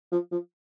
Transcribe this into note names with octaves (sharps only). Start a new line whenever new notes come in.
F3
F3